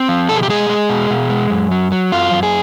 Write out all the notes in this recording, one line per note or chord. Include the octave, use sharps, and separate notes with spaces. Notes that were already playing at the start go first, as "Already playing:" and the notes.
Already playing: C4
F3
B2 A4
G#4
G4
G#3 G#4
G#3
B2
B2
G#3
F#2
F#3
F#3
F#2 F4
F#2
G#4